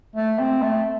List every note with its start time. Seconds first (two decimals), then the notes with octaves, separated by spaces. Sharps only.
0.16 A3
0.39 C4
0.62 A3